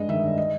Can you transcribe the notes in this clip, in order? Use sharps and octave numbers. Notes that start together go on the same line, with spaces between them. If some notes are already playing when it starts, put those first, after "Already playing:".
Already playing: G2 G#3 D#5
D#3 E5
G2
D#5